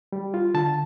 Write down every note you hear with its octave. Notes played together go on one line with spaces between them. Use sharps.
G3
F4
D3 A5